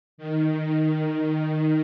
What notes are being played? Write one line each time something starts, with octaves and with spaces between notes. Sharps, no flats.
D#3